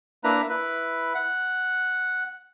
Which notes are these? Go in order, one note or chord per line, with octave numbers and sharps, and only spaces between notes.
A#3 D4 E4 B4 A#5
E4 B4
F#5